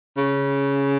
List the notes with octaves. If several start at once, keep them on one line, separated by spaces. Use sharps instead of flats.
C#3